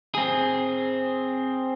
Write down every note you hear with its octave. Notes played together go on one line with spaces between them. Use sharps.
C4 G#4